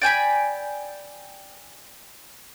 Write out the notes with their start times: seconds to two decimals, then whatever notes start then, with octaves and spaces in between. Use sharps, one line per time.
0.02 D5 G5 G#5 B5